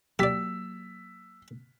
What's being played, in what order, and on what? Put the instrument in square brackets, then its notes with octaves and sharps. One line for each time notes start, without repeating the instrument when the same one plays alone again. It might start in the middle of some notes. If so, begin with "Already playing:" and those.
[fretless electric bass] F#3 A#3 [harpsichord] G4 D5 [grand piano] E6 B6